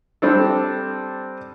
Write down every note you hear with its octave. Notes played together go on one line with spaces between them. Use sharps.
G3 C4 D4 A4